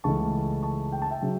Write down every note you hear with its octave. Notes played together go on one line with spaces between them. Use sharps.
C#2 C#3 E3 A3 A5 C#6
A5 C#6
G5
A5
E5 G5
C#3 F#3